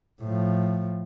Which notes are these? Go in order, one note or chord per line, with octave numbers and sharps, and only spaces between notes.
A2 F3